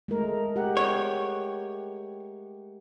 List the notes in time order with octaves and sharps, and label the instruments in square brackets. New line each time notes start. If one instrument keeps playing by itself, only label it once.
[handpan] G#3 A3 A#4
G4 F#5
[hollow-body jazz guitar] C#5